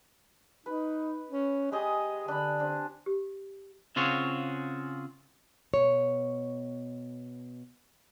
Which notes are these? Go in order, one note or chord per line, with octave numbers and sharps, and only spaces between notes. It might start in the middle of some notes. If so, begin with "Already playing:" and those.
D#4 B4
C#4
G#3 G4 G#4 D#5
D3 D4 B5
C4 D4
G4
C#3 C4 F4 F#4 G#4 C#5
B2 C#5